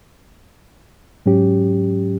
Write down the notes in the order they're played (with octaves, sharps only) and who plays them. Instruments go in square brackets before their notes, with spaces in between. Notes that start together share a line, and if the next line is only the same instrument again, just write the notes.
[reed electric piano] G#2 F#3 C#4 G4